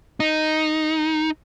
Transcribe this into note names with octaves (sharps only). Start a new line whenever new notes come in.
D#4